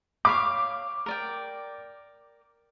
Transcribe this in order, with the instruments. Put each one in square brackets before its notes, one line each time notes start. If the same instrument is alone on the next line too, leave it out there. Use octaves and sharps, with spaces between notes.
[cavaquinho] C#5 F5 B5 [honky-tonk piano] D6
[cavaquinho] A#4 D5 G5